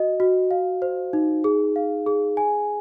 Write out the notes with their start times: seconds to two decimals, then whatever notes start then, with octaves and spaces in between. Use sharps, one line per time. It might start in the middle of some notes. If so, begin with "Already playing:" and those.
Already playing: F#4 D#5
0.20 F#4
0.51 F5
0.82 C5
1.13 D#4
1.44 G#4
1.76 F5
2.07 G#4
2.37 G#5